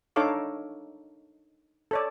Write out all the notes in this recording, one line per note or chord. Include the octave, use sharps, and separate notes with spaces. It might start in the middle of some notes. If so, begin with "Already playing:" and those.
D4 D#4 A4 C#5 F5 D6
A4 C#5 D5